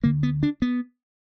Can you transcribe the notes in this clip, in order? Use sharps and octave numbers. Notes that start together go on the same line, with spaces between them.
D2 D3 A#3
B3
D4
B3